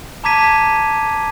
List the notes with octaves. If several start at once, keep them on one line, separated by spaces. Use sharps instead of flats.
A5 A#5 D6 G#6 B6 D#7